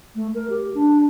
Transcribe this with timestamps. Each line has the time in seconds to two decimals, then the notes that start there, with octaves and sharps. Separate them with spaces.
0.16 A3
0.35 A#4
0.50 G4
0.75 D4